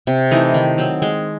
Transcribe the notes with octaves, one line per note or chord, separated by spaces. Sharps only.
C3
E3 A3 D#4
D#3
F#3 C4
G#3